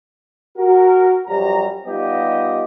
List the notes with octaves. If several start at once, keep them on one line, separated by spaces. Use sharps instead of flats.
F#4 A#4
F#2 F3 G3 G4 A#5
G3 B3 D#4 F4 G4 D#5